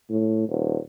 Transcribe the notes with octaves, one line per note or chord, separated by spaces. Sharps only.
A2
D#1